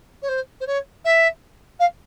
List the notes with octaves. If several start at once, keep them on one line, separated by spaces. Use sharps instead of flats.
C#5
C5
C5
C#5
E5
F5